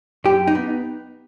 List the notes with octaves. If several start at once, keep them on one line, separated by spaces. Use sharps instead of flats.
F#2 G4
D#4
B3